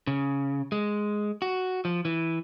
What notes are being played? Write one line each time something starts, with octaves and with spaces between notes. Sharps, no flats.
C#3
G#3
F#4
F3
E3